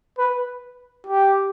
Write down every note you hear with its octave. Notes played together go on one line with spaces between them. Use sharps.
B4
G4